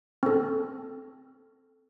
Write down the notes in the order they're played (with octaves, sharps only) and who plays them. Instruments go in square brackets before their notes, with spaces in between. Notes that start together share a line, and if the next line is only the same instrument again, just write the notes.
[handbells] C4 A4